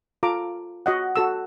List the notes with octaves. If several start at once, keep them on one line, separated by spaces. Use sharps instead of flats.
F4 A4 A#5 D6
F#4 D#5 F#5
F#4 A4 E6